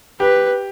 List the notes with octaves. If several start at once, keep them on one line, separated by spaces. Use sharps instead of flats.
G4 B4